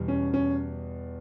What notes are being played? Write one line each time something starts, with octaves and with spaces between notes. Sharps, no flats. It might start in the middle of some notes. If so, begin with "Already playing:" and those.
Already playing: E2 B2 G3
C#4
C#4